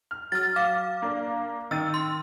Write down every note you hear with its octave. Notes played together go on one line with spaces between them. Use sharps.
F6
F#3 F6 A6
F5 D6
A#3 D4
D#3 E6 A6 D#7
C6